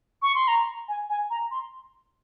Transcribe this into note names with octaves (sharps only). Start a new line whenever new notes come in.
C#6
C6
A#5
G#5
G#5
A#5
C6